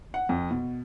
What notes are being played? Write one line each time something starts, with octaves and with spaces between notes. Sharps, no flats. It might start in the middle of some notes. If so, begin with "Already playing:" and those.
F#5
F2
B2